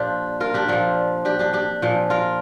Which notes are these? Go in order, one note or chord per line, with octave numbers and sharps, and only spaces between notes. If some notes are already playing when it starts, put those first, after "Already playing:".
Already playing: A#2 F3 D4 F4 G4
F4 A#4
D4 G4
A#2 F3 C4 F4
D4 G4
D4 G4
D4 G4
A#2 F3
F4 A#4